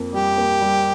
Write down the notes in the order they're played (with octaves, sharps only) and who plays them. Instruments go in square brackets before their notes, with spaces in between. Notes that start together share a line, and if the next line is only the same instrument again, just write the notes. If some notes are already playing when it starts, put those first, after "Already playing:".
Already playing: [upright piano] F2 A#3
[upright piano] G3 [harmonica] G4
[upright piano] A#3
G3